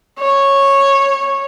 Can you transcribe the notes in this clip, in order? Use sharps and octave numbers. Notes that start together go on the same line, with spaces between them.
C#5